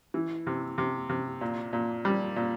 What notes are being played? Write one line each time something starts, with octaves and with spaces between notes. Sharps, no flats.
E3
C3
C3
C3
A#2
A#2
G3
A#2